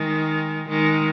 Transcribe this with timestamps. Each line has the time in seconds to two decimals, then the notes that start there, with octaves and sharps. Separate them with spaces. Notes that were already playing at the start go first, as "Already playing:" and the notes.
Already playing: D#3 G#3
0.69 D#3 G#3